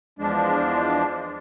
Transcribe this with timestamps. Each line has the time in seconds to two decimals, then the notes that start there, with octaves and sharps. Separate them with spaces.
0.19 E2 F3 G#3 D4